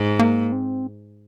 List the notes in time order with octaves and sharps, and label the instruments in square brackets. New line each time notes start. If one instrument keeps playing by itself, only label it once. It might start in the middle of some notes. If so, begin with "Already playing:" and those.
Already playing: [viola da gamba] G#2
[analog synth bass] A#3
C4